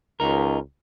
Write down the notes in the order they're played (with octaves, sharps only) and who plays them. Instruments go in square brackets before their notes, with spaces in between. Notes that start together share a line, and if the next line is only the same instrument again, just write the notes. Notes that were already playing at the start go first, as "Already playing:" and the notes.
[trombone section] C#2 [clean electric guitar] D#4 A#4